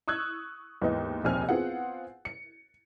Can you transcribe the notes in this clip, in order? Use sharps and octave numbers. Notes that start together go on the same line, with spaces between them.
C#6 D#6 E6 F#6 G#6
D#2 G#2 E3 B3 D#5
F1 A#1 D#2 C4 G#5 F6
B3 C4 F4 G#4 F#5
C#7